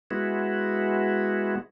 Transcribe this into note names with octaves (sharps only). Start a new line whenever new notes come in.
G#3 B3 E4 F#4